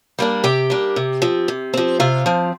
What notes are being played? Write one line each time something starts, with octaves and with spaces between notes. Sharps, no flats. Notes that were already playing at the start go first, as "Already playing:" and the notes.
G3 A#3 D4
C3 G4 G5
G3 A#3 D4
C3
F3 C4
C3
F3 C4
C3 F4 F5
F3 C4